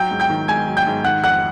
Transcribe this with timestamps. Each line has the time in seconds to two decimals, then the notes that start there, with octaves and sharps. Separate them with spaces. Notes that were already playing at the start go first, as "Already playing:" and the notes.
Already playing: F#3 G5 G6
0.11 G#2
0.20 G5 G6
0.30 D#3
0.48 G#2 G#5 G#6
0.68 F#3
0.77 G5 G6
0.87 G#2
1.04 D#3 F#5 F#6
1.23 F2 F#5 F#6